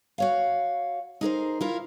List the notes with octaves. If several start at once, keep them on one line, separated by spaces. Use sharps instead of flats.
F#4 C#5 F5
D#4 G#4 A#4 C5
E4 F4 A#4